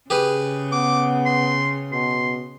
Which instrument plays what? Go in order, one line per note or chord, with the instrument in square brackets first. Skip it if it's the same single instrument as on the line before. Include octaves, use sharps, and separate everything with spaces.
[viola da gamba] C#3 [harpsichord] G4 G#4 B4
[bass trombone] B3 [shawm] D6
[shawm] C6
[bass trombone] B2 [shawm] C6